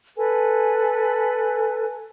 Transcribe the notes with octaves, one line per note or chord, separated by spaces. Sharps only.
A4 B4 G#5